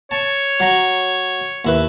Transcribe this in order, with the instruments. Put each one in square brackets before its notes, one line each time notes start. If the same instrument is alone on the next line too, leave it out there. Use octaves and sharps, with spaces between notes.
[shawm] C#5 [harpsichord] A5
[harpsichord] F#3 A#5
D#2 E4 B4